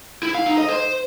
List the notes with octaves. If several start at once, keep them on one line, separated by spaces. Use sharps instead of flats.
E4
F5
D#4
D#5
C5